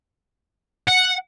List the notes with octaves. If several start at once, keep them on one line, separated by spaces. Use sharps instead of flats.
F#5